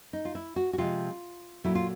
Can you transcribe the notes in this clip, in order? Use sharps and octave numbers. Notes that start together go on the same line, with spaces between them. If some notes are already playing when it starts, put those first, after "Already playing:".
D#4
F4
E4
F#4
F#4
C3 F3 G#3 F4
A#2 F#3 A3 E4
F4